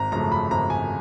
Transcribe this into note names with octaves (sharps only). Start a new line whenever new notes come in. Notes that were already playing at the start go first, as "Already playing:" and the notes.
Already playing: G#1 A#5
F#2 C#3 F3 A3 A#5
B5
G#1 A#5
G#5